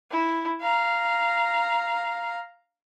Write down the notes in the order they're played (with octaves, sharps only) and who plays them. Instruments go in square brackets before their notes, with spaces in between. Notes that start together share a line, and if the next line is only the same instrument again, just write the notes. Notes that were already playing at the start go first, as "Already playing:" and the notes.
[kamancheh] E4
F5 A#5